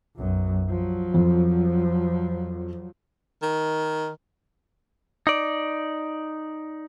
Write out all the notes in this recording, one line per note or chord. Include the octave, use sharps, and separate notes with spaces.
B1 F#2
F3 F#3
F2
D#3
D#4 D5